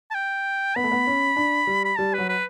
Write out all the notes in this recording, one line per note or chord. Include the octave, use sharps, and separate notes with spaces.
A5
G5
B3 B5
A3
B3
C#4
D4
G3
B5
G3 A5
F#3 B4
B4